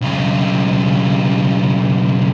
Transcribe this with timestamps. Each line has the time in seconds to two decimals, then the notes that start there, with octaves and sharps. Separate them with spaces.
0.01 B1 C#3